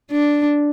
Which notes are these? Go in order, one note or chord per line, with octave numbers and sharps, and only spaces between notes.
D4